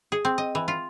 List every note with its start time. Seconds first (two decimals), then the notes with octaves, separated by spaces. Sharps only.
0.12 G#4
0.25 C4
0.38 D#5
0.55 E3
0.68 F4